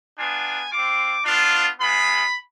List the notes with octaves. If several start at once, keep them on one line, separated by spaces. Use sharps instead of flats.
B3 D4 F4 G#5
C4 F4 D6
B3 D4 F4
G#3 B3 F4 B5